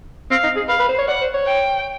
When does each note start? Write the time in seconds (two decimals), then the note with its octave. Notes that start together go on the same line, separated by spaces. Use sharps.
0.31 C4 F5
0.43 D#4
0.56 G#4
0.69 B4 F5
0.79 B4
0.89 C5
0.98 C#5
1.08 D5 F#5
1.21 C5
1.34 C#5
1.46 G5